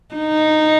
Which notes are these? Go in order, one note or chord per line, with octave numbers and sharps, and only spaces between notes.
D#4